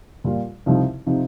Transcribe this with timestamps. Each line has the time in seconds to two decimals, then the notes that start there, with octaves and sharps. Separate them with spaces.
0.24 A#2 G3 A#3 F4
0.66 C2 C3 F3 C4 D#4
1.07 C3 F3 C4 D#4